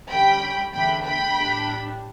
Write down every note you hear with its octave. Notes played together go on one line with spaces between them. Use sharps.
D3 G3 C#4 G5 B5
E2 D3 A3 D4 G5 B5
G5 B5
A2 G3 D4